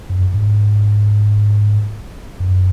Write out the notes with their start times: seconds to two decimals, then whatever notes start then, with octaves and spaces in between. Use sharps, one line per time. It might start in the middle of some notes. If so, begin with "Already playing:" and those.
0.09 F#2
0.34 G#2
2.40 F#2